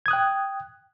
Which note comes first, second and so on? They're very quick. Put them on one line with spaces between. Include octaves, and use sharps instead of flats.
G#6 D#6 F#6 G5